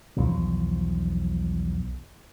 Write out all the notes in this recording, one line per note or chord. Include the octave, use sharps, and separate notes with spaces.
B1 E2 F3